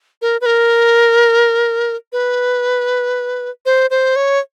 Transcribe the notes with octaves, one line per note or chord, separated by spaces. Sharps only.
A#4
B4
A#4
B4
C5
C5
C#5